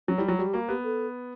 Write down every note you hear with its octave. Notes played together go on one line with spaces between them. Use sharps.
F#3 C#4
G3 E4
F#3 F4
G3 F#4
G4
A#3 F#4
B3 G4
A4